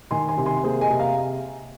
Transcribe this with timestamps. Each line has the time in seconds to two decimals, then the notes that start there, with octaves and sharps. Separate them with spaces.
0.11 D#3 G#5 C6
0.29 G#5 C6
0.37 C3
0.46 G#5 C6
0.64 A#3 G#4 C5
0.81 D#5 G#5
0.90 C3
0.99 F5 A#5